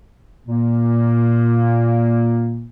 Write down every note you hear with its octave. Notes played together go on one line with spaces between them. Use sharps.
A#2 A#3